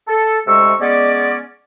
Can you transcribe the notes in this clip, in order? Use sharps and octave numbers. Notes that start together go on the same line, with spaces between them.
A4
D2 C3 G#3 C#6 E6
G#3 B3 C#4 D5